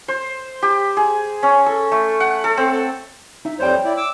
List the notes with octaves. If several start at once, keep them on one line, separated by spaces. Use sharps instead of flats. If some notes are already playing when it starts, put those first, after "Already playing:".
C5
G4
G#4
C#4
A4
A3
F#5
A4
C4
D#4 E5
F2 G3 C5 C#5 G5
E4 D5
D6 E6